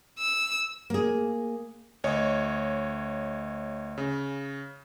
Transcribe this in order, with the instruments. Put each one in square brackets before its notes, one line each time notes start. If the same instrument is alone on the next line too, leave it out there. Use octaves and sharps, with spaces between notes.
[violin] E6
[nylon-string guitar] A#3 G#4
[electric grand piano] D2 C#5 D#5
C#3